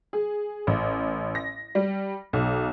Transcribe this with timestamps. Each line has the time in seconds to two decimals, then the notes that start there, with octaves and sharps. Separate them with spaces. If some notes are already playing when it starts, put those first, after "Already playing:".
0.13 G#4
0.67 A1
1.35 A#6
1.75 G3
2.33 B1